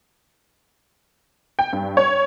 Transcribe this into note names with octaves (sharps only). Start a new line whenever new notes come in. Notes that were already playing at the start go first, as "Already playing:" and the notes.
G5
G2
C#5